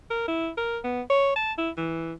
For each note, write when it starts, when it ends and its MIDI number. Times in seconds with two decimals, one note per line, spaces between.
0.10 0.26 70
0.28 0.49 64
0.57 0.78 70
0.84 1.02 59
1.10 1.34 73
1.36 1.52 81
1.58 1.70 64
1.77 2.13 52